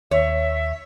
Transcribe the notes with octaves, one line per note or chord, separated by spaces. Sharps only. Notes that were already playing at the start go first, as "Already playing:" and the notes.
D#2 C#5 E5